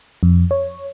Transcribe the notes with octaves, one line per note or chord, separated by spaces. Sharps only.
F2
C#5